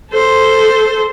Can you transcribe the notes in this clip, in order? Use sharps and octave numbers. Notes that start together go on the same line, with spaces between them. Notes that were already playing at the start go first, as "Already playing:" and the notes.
A4 C5